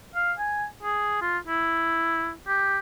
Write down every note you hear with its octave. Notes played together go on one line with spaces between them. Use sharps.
F5
G#5
G#4
F4
E4
G4